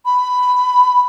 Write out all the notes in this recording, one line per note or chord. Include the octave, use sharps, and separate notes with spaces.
B5